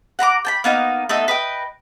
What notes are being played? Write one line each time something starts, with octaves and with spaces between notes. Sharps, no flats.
F#5 A#5 B5 D6
G5 A5 B5
A#3 B3 D#4 F5
A3 B3 D#4 A4
B4 D#5 G5